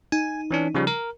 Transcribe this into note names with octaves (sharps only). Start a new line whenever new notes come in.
D#4 G#5
E3 C#4 D4
C#3 F3 G3
A#4